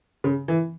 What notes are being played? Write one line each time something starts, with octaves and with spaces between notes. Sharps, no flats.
C#3
E3